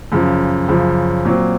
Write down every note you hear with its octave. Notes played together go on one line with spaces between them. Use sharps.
F#2 C#3 F3
F#2 C#3 F3
A#2 F#3 C4